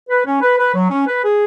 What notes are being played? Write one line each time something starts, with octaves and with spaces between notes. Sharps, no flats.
B4
C#4
B4
B4
F#3
C#4
B4
G#4